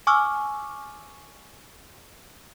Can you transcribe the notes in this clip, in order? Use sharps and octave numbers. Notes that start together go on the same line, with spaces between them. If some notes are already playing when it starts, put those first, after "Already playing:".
G#5 C#6 D6 E6 F6